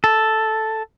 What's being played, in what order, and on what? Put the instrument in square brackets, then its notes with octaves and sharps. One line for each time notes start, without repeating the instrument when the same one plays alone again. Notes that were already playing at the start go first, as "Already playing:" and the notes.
[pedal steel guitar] A4